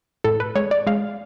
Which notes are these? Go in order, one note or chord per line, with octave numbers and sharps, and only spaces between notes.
A2 A4
B4
G#3 C#5
D5
G#3 F5